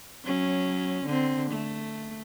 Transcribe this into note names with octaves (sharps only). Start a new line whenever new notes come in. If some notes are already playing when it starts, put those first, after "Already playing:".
F#3 C#4
D3 C4
A3